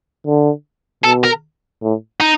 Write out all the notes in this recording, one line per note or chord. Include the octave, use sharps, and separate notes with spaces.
D3
B2 A4
A#4
A2
D#4